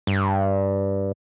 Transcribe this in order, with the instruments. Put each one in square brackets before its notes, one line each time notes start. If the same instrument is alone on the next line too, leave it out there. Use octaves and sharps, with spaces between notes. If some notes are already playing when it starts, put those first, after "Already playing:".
[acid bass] G2